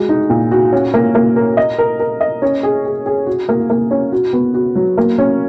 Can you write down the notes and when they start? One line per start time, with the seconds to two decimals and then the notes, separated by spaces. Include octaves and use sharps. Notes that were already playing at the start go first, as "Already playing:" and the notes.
Already playing: G#3 F#4
0.09 D#4
0.30 A#2
0.51 F#4
0.72 C#4
0.94 A#3
1.15 A#3
1.36 A#4
1.57 D#5
1.78 A#4
2.00 A#4
2.21 D#5
2.42 C#4
2.63 G#4
2.85 G#4
3.06 G#4
3.27 F#4
3.49 A#3
3.70 A#3
3.91 C#4
4.12 F#4
4.33 B3
4.54 F#4
4.75 F#3
4.98 A#3
5.18 C#4